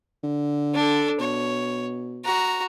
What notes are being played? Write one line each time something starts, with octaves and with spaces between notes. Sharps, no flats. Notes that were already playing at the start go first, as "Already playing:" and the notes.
D3
D4 A4
B2 C#5
F#4 A#5